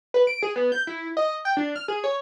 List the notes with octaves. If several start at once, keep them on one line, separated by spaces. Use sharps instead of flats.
B4
D7
G#4
B3
G6
E4
D#5
G5
D4
F6
G#4
C#5